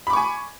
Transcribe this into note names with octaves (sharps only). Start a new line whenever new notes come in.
G#5 B5 C#6 D6